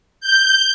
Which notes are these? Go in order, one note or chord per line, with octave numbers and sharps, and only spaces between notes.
G6